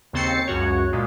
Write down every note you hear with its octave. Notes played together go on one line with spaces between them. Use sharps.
D#2 C#3 C4 A6 C7 C#7
C#2 F#2 F#4 C#5
A#2 G#3